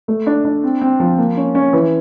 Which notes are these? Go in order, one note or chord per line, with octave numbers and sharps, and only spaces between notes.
A3
D4
D4
C4
C4
F3
A#3
C#4
C#4
E3